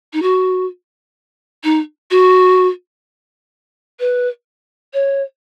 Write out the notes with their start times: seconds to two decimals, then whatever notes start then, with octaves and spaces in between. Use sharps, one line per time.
0.13 D#4
0.22 F#4
1.64 D#4
2.11 F#4
4.00 B4
4.93 C#5